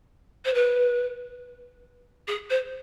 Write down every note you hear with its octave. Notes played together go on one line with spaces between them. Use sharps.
C5
B4
G#4
C5